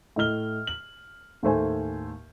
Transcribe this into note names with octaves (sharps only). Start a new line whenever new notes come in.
A2 E4 D#5 E5 F6 G7
F#7
D#2 A2 A3 C5 G#5